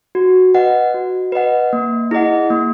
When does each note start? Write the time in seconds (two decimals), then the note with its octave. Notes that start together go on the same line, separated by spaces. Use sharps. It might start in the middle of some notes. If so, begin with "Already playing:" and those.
0.15 F#4
0.55 B4 D#5 F#5
0.94 F#4
1.32 B4 D#5 F#5
1.73 A#3
2.11 E4 G#4 D#5 F#5
2.50 A#3